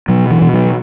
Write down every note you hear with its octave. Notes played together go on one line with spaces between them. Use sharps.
B2 F#3
E3
B2
F#3